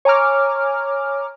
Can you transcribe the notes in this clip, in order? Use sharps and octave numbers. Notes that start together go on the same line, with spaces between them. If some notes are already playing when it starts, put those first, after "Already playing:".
C#5 G#5 A#5 D6 F6